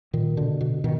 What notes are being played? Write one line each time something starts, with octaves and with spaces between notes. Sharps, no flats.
A#2 D#3
B2 D3
B2
B2 D#3